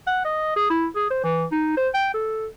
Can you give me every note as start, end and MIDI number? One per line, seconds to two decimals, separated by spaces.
0.07 0.21 78
0.25 0.53 75
0.56 0.68 68
0.70 0.87 64
0.96 1.09 68
1.10 1.21 72
1.24 1.45 52
1.52 1.75 63
1.77 1.89 72
1.94 2.11 79
2.14 2.47 69